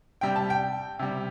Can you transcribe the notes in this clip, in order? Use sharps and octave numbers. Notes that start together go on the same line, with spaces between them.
C3 G3 G5
A5
G5
C3 G3